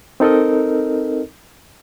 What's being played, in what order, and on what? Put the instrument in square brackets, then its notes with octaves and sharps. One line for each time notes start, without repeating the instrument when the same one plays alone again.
[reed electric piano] C4 D#4 A4 A#4 D#5